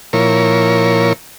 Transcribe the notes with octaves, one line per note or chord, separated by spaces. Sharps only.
A#2 F3 E4 A#4 C#5